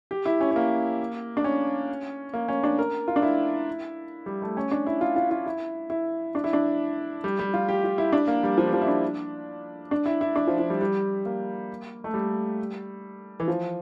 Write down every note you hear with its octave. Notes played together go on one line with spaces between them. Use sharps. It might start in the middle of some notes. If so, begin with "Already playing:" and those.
G4
E4
C#4
C#4
A#3
D4
C#4
A#3
C#4
D4
A#4
F4
D4
E4
G3
A3
C#4
D4
E4
F4
F4
F4
E4
E4
D4
E4
D4
G3
G3
F4
G4
F4
E4
D4
A#3
G3
F3
G3
F3
E4
D4
D4
E4
E4
D4
F3
F3
G3
G3
A#3
A3
G3
E3
F3